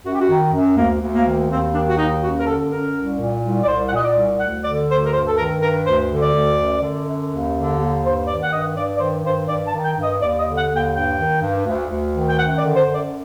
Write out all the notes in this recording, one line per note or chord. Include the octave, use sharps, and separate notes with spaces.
F#2 F#4
G4
F#4
D#3
F#2
D2 A#3
D2
A#3
D#3
D#2 C4
D#3 D4
F#4
D#2 D#4
F#2 F#4
A#4
D3 A4
F#2 A#4
C2
A#2
C2
D5
C2 C5
F#5
A#2 D#5
D5
C2
D2 F#5
D3 D5
D2 C5
A#4
G2 C5
A4
D#3 A#4
G2 A#4
D2 C5
D3
D5
D2
F#2
D3
F#2
D#2
D3
D#2
G2 C5
D#3 D5
F#5
G2 D#5
G2 D5
D5
D#3 C5
G2 C5
G2 D5
A5
D#3
G5
G2
D#5
D#2 D5
D#5
D3
F#5
D#2
G5
G2 G5
D#3
G2
D2
D2
D#3
G5
F#2 F#5
D5
D3
C5
F#2
D5